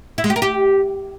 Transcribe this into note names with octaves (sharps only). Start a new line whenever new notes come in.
E4
G#3
G4
A#4
G4